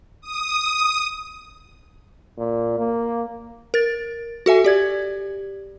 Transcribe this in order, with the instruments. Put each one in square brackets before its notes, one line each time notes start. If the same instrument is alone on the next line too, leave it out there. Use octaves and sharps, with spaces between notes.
[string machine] D#6
[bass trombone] A#2
A#3
[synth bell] A#4 A6
F#4 A4 E5 G#5
G4 D5 G#6